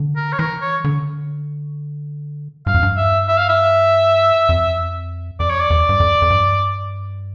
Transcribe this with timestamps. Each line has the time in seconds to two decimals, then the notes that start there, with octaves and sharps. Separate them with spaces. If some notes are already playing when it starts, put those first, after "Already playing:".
Already playing: D3
0.16 A#4
0.32 C#5
0.39 E3 A#4
0.61 C#5
0.84 D3
2.66 G2 F5
2.74 F2
2.83 G2
2.97 E5
3.28 E5
3.38 F5
3.49 E5
4.49 F2
5.40 F2 D5
5.50 C#5
5.60 D5
5.70 E2
5.89 G2
6.00 F2
6.22 F2
6.30 G2